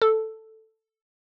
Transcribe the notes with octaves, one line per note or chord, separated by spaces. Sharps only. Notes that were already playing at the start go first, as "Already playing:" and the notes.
A4